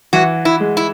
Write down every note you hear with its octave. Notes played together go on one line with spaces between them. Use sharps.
E3 F#4
E4
G#3
E4